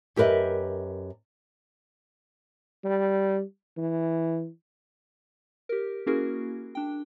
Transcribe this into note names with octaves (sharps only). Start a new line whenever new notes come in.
F#2 G4 A#4 B4 D#5 E5
G3
E3
G4 A#4
A#3 C#4 E4 F#4 G#4 A#4
D4 G5